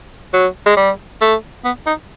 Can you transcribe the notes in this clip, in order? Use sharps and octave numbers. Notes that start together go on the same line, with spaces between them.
F#3
G#3
G3
A3
B3
D#4